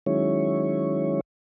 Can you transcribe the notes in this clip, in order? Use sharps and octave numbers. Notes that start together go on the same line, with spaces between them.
D#3 F#3 G#3 C#4 E4 C#5